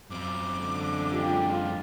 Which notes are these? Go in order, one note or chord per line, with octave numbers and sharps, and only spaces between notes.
F#2 C4 D6
D3 G#3
F4 G4
F4